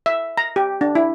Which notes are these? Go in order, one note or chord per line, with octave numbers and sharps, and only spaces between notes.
E5
A#5
G4
D4
E4